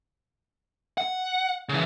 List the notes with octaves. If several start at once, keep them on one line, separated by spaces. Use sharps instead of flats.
F#5
C#3 E3